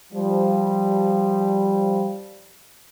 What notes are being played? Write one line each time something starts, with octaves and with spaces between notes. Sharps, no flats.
F3 G3